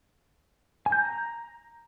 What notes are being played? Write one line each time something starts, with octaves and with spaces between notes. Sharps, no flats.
G#5
G6
A#5